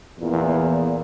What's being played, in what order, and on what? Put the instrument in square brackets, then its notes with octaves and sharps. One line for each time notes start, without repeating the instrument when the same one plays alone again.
[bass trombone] E2 [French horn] A#2